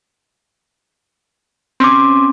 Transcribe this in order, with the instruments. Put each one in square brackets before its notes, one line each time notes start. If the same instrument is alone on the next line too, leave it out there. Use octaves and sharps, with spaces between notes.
[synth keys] C4 C#4 [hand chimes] C6 D6